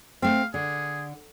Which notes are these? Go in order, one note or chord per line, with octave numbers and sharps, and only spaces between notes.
A3 C4 F5
D3 G#4